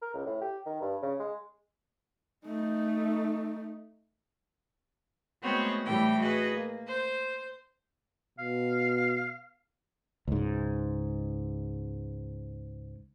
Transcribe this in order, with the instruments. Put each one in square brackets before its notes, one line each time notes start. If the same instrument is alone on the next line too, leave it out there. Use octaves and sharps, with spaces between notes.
[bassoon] A#4
C#2
A2
G4
D#3
G2
C#3
G#3
[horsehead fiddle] A3 D#4
[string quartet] G#3 A3 B3 C4 F#4 C#5
A2 E3 G3 G4 G5
F#4 G#4 B4 D#5
A#3
C5 G6
[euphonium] B2 [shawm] F5
[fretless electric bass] C#2 G#2